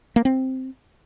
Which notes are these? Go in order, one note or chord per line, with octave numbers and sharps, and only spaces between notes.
A#3
C4